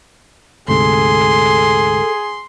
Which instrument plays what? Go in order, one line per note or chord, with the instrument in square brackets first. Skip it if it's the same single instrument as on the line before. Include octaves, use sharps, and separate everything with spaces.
[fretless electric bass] D2 G#2 C3 [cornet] G#4 [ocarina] A4 [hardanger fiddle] C6